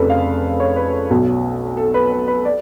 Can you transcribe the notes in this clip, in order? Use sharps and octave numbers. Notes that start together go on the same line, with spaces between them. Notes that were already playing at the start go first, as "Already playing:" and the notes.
Already playing: F1 F2 C#3 A4 B4
F5
C#5
B4
B1 B2
A4
B4
B4
B4
D5